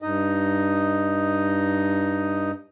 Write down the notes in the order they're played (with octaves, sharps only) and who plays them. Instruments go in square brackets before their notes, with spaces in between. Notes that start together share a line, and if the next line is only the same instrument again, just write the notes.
[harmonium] G2 D#4 D#5